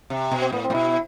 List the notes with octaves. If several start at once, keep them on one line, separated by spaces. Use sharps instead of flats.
C3
B2
C4
A2 B3
C4
A2
B2 E4